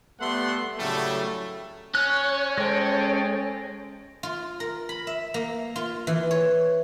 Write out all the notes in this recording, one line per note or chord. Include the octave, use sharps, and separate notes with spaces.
G3 A3 B3 E5 F#5 C6
A2 C#3 F#3 G3 A3
C#4 C#5 F#6
G#3 A4 C5 G5
F4
A#4
B5
E5
A#3
F4
E3
C#5